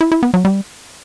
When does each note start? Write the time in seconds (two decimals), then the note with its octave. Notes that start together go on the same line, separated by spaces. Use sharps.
0.01 E4
0.12 E4
0.23 B3
0.34 F#3
0.45 G3